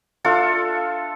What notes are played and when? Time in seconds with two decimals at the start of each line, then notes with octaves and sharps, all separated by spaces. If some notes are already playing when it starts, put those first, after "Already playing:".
0.24 D4 F4 A4 E5